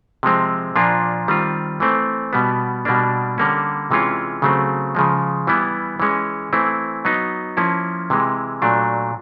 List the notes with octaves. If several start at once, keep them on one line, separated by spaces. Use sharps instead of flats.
C3 F3 G#3 C4
A#2 F3 A#3 D4 F4
D#3 G3 C4 F4
E3 A3 C4
B2 G3 B3
B2 G3 A#3 D4
D3 G3 A#3 C#4
C3 E3 G#3 C#4 F4
C#3 F#3 A3 C4
C#3 F3 G#3
E3 G3 B3 E4
E3 G#3 C#4
E3 A3 C4 E4
F#3 B3 D#4
F3 A#3 C#4 E4
C3 E3 G#3
A#2 F#3 A3 D4